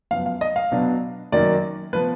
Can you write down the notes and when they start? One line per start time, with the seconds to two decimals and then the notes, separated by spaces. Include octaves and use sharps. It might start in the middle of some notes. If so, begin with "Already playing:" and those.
0.11 F#2 F3 B3 F5
0.26 F5
0.41 D#5
0.56 F5
0.72 B2 F#3 B3 D4
1.32 F#2 D#3 F#3 A#3 D5
1.93 F3 B3 B4